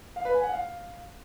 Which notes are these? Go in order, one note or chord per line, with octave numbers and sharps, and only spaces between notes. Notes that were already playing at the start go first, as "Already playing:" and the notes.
F5
B4
G#5
F#5
F5